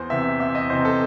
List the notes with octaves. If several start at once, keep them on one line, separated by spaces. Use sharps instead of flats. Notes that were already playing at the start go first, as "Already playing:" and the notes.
Already playing: E2 C5
C3 E3 E5
E2 E5
D#5
C3 E3 C5
A4